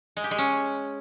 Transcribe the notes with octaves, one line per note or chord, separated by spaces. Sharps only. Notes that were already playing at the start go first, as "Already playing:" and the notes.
G#3
G4
G#3
C#4